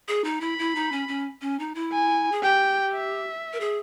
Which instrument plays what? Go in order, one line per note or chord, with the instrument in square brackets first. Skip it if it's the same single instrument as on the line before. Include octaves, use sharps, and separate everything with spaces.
[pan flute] G#4
D#4
[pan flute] E4 [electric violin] B5
[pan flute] E4
D#4
C#4
C#4
C#4
D#4
E4
[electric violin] G#5
[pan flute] G#4
[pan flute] G4 [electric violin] G5
[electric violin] E5
[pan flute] A#4
G#4